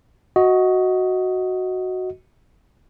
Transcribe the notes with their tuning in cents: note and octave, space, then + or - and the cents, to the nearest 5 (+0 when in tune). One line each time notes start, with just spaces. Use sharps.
F#4 +0 D#5 +15